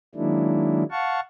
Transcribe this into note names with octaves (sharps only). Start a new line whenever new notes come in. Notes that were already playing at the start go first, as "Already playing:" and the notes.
D#3 F#3 G#3 A#3 D4 E4
F5 F#5 A5 C#6